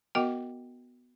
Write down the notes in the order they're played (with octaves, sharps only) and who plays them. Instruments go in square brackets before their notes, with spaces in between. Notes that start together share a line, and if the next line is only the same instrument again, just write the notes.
[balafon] B3 F#4 A#4 D#5 G5 D6